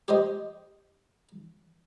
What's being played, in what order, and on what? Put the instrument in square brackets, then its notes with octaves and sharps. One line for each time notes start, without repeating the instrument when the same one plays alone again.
[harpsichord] G4 C5 D#5